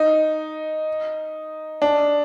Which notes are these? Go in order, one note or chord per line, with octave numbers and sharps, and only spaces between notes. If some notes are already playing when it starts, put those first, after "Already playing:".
Already playing: D#4
D4